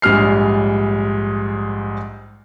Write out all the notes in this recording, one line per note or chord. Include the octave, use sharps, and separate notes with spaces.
A#1 G#2 G3 F6 C7